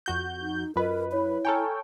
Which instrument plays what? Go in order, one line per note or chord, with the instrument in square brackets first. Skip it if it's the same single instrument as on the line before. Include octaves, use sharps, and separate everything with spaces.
[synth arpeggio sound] F2 F#4 G6
[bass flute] D#4
[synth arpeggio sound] F#2 B4 [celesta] F4 D#5 [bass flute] A#4
[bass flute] E4 [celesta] C#5
[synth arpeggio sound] A4 C#5 G5 [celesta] G#5 A#5 F6